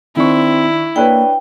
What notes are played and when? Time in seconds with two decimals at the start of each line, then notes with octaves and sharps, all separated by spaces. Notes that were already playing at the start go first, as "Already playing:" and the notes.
0.17 D#3 C4 D4 E4 C#6
0.96 A#3 D4 B4 C#5 G5